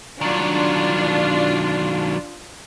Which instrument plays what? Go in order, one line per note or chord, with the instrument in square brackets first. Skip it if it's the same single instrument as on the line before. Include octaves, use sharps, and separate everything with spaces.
[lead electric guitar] D#3 F#3 [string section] D4 F4